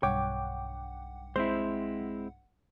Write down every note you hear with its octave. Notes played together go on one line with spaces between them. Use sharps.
B1 G2 C#5 F#5 G5 D6
G#3 C4 E4 C5